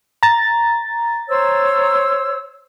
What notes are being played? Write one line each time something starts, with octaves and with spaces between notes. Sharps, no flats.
A#5 A6
C5 C#5 E6